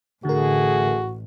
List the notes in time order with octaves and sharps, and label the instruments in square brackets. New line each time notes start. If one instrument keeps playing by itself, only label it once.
[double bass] A1 [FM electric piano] D3 A#4 [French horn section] A3 G#4 [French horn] F#4